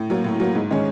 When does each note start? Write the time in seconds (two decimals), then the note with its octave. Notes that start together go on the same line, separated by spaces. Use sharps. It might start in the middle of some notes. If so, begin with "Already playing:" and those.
Already playing: A2
0.10 F#3 A#3
0.24 A2
0.40 F#3 A#3
0.55 G#2
0.70 D#3 G#3 C#4